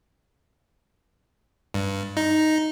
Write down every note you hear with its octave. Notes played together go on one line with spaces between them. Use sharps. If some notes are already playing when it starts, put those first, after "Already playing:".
G2
D#4